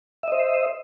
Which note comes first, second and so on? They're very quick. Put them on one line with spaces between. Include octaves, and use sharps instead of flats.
E5 D#5 C5